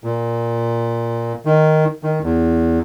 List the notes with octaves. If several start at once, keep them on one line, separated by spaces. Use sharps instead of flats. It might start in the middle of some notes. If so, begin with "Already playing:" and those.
A#2
D#3
D#3
E2